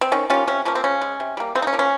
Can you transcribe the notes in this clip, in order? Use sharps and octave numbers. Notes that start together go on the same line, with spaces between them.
C4
D#3 C#4
G3 A#3 C#4 F4
C3 C#4
F3 A#3 C#4
C4
C#3 C#4
G#3
C3
G3 A#3
C#3 C4
D#4
C#4
F3 A#3
C#4